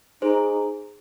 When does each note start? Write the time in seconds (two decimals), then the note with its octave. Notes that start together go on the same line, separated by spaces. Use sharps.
0.22 D#4 G#4 C5